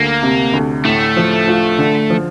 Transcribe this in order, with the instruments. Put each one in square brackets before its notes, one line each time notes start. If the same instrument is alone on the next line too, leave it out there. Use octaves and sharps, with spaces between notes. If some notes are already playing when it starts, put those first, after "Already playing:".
Already playing: [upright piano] D2 [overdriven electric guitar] A#3
[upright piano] C3
D2
[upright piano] A2 [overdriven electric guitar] A3
[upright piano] F3
F4
D3
F3